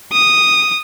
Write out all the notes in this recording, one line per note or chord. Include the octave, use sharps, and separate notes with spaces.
D#6